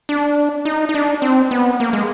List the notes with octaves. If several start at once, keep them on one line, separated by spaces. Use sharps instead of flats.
D4
D#4
D#4
D4
C4
B3
A#3
G#3